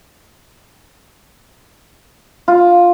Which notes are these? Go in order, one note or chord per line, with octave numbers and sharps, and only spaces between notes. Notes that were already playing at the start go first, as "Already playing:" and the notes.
F4